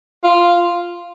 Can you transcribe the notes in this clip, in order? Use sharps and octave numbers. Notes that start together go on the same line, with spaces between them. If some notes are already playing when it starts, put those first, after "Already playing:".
F4